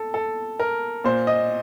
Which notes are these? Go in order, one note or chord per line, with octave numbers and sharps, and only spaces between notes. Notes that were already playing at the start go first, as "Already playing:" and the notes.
Already playing: A4
A4
A#4
A#2 C5
D#5